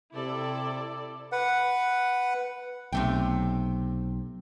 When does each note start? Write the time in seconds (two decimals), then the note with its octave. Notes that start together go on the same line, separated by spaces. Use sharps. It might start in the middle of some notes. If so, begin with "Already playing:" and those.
0.14 C3 E4 A4 D5
1.32 B4 F#5
2.92 B1 C3 A3 G5